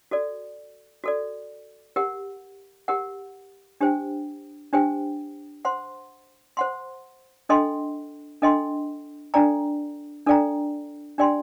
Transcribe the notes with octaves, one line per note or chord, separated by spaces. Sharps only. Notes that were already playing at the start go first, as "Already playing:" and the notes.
F#4 A4 D5
F#4 A4 D5
G4 A#4 F#5
G4 A#4 F#5
D4 G4 C5 G5
D4 G4 C5 G5
C5 F#5 C6
C5 F#5 C6
D4 A4 D#5 G5 C6
D4 A4 D#5 G5 C6
D4 A4 D5 G5 A#5
D4 A4 D5 G5 A#5
D4 G4 D5 G5 C6